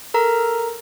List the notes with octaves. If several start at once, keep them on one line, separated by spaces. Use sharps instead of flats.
A4 A#4 A#5